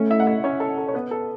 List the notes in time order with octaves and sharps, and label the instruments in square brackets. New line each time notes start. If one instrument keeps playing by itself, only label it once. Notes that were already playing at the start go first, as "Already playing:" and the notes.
Already playing: [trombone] A3 [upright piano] C#4 C#5
[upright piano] E4 E5
F#5
E4 E5
C#4 C#5
A4
A4
C#5
B3 B4
A4